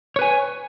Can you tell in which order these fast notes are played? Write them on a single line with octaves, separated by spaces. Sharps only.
C#5 B4 G#5